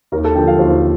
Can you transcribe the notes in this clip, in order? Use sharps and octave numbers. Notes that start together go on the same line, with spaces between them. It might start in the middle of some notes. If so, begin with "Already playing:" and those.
D#2 A#4
A4
D3 F3 G5
F5
D#2 C5